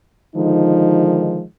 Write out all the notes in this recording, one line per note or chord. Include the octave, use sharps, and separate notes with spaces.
D3 D#3 F3 G#3 D#4